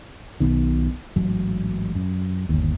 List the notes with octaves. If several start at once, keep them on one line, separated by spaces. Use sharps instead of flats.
B1 B2 D#3
A1 G#2 F#3
F#2
G1 D#2